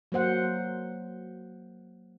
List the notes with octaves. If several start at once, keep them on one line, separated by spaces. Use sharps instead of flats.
F#3 A#3 C5 F#5